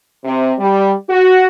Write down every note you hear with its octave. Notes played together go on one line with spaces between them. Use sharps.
C3
G3
F#4